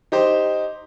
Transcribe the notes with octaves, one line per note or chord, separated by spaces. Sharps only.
D#4 G4 C5